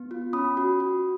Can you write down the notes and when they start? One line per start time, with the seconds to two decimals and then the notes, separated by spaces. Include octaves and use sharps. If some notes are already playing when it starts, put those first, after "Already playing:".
Already playing: B3
0.11 F4
0.33 C#4 B5 D#6
0.57 F#4
0.80 F#4